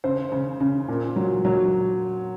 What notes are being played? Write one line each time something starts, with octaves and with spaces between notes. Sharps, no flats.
C#3 C5
C#3
C#3
A#2
F#3
F#3